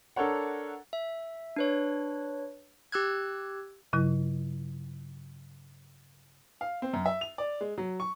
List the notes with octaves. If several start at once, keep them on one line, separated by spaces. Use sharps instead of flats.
D4 A4 A#4 C#5 F#5
E5
D4 B4 C#5
G4 E6 F#6 G#6
G2 C#3 F#3 E4
F5
C4
F#2
E5
F7
D5
G#3
F#3
C#6